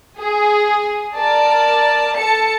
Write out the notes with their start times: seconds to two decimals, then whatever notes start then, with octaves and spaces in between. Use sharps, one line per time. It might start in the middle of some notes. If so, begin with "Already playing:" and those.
0.19 G#4
1.14 A#4 D5 A5
2.16 A4 A5 C#7